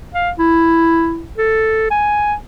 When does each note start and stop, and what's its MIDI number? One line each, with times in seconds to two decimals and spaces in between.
0.14 0.31 77
0.39 1.24 64
1.38 1.87 69
1.91 2.34 80